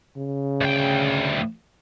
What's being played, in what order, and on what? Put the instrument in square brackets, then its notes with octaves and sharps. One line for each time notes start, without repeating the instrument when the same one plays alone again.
[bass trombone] C#3
[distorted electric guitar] D2 G5